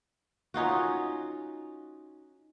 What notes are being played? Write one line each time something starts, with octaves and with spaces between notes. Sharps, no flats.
C#4 D#4 F4 F#4